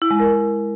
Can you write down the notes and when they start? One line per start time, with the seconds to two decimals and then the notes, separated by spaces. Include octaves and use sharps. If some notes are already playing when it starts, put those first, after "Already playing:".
0.02 E4
0.11 G#3
0.20 A#4